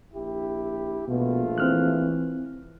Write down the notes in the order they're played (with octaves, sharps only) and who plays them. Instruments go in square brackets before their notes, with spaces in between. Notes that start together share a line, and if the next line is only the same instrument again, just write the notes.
[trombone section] A#1 E4 G4
[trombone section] A#1 A3 F4 [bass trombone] B2
[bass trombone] E3 [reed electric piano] C4 F6 F#6